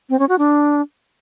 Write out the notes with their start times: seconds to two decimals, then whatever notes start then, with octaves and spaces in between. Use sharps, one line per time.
0.10 C4
0.19 C#4
0.29 F#4
0.39 D4